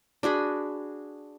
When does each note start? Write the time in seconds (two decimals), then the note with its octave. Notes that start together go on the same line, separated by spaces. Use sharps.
0.23 D4 F#4 G#4 B5